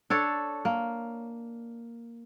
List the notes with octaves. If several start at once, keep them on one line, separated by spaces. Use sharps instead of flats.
D4 A4 C#5
A#3